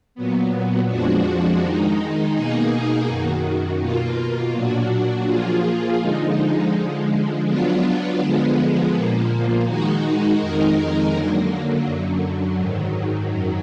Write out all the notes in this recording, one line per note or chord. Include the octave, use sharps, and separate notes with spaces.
A#2 F#3 B3
F2 F3 G#3 D4 F#4
D#3 G#3 D#4
B2 A#3 D#4 G#4
F#2 D#3 F#3
B2 A#3 F4
A#2 F#3 D4 F#4
F3 A#3 F4 G#4
D3 F3 G#3 D#4
D3 F3 G#3
F#3 B3 D4 F4
D3 F3 G#3 B3
A#2 F3 A#3
D#3 G#3 D#4 F#4
F2 D#3 G#3 D#4 A#4
D3 F#3 A#3
F#2 D3 F#3
G#2 D#3 F#3
F#2 D#3 F#3